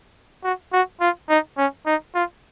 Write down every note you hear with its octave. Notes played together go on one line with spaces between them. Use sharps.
F#4
F#4
F4
D#4
C#4
D#4
F4